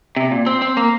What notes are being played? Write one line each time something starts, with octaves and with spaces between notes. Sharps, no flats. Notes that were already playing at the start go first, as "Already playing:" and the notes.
C3
A#2
C4
C4
A#3